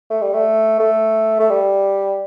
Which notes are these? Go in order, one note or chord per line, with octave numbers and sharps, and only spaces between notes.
A3
G3
A3
A3
A3
G3